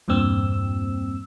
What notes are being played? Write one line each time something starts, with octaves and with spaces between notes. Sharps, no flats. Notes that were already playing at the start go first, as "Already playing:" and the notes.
E2 G2 A#2 C4 E6